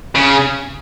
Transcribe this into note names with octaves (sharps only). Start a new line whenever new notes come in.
C#3